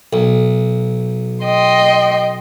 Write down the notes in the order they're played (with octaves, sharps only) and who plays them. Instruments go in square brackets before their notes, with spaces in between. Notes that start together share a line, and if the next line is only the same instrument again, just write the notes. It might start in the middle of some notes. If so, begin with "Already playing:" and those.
[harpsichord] B1
[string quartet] D#5 G5 C6